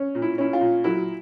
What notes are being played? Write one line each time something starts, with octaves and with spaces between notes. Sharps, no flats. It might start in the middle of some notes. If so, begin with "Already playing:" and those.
Already playing: C#4
A#2
E4
C#4 E4
F4
A#2
F#3 E4